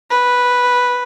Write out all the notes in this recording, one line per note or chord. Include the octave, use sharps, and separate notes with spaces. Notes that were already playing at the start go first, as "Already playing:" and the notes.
B4